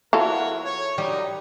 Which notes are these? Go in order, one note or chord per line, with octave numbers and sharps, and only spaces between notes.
E3 F4 F#4 A4 A#4 C#5
C#5
F#2 G3 D#4